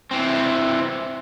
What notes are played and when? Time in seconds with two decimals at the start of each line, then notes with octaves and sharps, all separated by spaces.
0.11 E3 C4